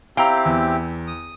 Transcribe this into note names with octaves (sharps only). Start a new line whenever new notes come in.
C4 E4 G4 F5 G5 A#5
E2
D#6